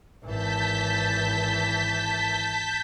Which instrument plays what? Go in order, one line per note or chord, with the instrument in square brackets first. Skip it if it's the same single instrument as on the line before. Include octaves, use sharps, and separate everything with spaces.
[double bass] G#1 E3 [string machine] A5 G6 B6